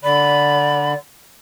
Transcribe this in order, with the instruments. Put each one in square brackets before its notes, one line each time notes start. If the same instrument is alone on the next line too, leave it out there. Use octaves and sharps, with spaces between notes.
[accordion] D3 [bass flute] D5 [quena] B5